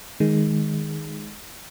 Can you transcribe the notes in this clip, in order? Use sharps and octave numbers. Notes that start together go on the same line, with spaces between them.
D#3 G#3